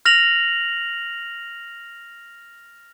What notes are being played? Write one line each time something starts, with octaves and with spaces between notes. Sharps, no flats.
F6 A#6 F7 F#7